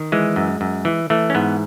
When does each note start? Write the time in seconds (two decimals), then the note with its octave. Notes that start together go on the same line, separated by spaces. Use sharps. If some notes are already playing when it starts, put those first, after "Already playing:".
Already playing: D#3
0.12 E3 G#3
0.36 F#2
0.61 F#2
0.85 E3
1.10 E3 A3
1.30 C#4
1.35 G#2 B3